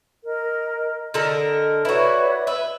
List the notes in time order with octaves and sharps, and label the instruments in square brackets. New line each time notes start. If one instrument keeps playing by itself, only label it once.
[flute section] A#4 D#5
[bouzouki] D3 A4 A#4 [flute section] D#5
[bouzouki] E4 F#4 [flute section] B4 C#5 D5
[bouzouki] B4 E5